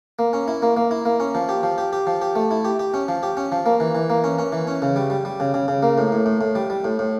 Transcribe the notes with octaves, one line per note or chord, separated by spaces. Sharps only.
A#3
C#4
E4
A#3
A#3
E4
A#3
C#4
F3
G4
F3
G4
G4
F3
G4
A3
E4
G4
G4
C#4
F3
G4
C#4
F3
A#3
E3
E3
A#3
C#4
C#4
E3
C#4
C#3
G3
G3
G3
C#3
C#3
C#3
A#3
A2
A2
A2
A2
G3
G3
A2
A2